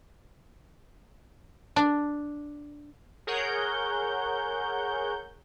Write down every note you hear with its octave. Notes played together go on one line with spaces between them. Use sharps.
D4
G#4 A#4 C#5 F#5 G6